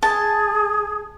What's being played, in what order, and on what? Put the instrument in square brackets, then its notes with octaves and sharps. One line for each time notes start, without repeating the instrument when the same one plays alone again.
[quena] G#4 [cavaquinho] A5